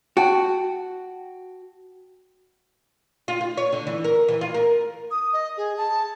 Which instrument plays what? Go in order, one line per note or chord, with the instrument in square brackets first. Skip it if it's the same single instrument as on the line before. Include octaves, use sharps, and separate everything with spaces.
[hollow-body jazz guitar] F#4 [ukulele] G5 A5
[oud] F4
F4
C#5
D3
E3
A#4
E3
F4
A#4
[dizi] D#6
D#5
G#4
A5